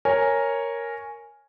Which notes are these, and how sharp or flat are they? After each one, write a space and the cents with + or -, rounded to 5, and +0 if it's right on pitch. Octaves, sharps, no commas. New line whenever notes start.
A#4 +0 C#5 +0 G#5 +0